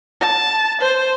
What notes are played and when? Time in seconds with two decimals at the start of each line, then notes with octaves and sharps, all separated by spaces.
0.21 A5
0.81 C5